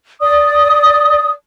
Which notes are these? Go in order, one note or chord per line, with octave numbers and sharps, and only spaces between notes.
D5 D#6